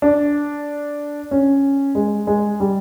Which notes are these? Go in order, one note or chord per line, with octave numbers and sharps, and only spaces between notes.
D4
C#4
G#3
G#3
G3